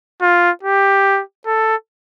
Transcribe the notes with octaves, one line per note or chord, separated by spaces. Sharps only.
F4
G4
A4